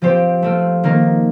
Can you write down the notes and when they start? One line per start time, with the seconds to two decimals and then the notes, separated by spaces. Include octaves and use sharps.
0.02 F3 C4 G4 C5
0.42 A3 C4 F4
0.84 D#3 A#3 D#4 A#4